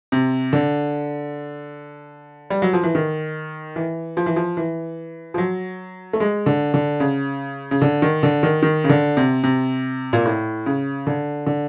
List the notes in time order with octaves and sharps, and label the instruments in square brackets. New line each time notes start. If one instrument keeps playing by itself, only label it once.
[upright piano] C3
D3
G3
F#3
F3
E3
D#3
E3
F3
E3
F3
E3
F3
F#3
A3
G#3
D3
D3
C#3
C#3
D3
D#3
D3
D#3
D#3
C#3
D3
C3
C3
A#2
A2
C#3
D3
D3